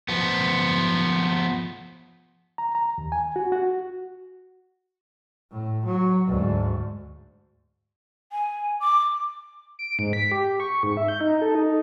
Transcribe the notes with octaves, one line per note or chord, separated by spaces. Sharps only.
F3 B3
A#5
A#5
D#2
G#5
F#4
F#4
A2
F#3
D2 G#2
G#5
D6
D7
G#2
B6
G4
C#6
G#2
E5
G6
D#4
A4
D#4